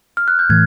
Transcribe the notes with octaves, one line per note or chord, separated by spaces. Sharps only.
F6
F#6
G6
A2 E3 G#6